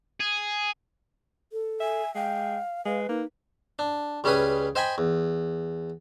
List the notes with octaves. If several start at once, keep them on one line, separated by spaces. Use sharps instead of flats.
G#4
A4
E5 G#5
G#3 F5 G5
G#3 B4 F5
A#3 D#4
D4
C#2 G3 C#4 G#4 B4 D#6
C5 D#5 G5 G#5 B5
E2